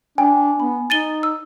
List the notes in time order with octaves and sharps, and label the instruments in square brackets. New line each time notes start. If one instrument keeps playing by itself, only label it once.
[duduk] D4 [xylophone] G5 [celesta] G#5
[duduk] B3 [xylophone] B5
[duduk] D#4 [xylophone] A6 D#7 G7
[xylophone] E6